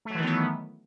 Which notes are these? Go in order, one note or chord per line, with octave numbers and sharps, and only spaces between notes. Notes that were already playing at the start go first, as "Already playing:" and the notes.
D#3 E3 F#3 A3 B3